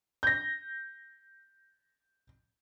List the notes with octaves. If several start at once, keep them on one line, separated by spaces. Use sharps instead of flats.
G6 A#6